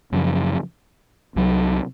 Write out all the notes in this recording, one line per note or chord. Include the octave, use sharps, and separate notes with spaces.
F#2 C#3 F3
C2 C3 F#3